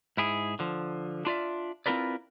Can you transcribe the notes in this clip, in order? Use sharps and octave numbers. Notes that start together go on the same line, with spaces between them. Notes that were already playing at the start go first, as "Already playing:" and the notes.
G#2 E4 G#4
D3 F3
D4 F4 D5 E5
C4 E4 F4 A#4 B4 D5